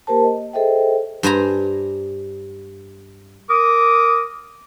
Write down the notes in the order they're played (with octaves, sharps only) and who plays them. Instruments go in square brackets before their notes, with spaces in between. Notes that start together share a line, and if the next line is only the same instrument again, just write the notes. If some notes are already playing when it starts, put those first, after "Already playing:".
[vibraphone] A#3 G4 A#4 C5 A5
D#5
G#4 A4 C5 D#5 E5 G5
[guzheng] G2 C5 G#5 A#5
[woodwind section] A#4 D6 D#6